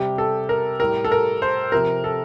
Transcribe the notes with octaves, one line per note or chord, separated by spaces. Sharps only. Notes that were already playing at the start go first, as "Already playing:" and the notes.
Already playing: C3 G3 G4
A4
A#4
A2 G3 A#4
A4
A#4
C5
C3 F3 A#4
A4